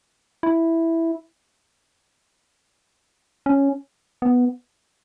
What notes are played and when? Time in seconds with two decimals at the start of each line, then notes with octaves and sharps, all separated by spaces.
0.43 E4
3.46 C#4
4.22 B3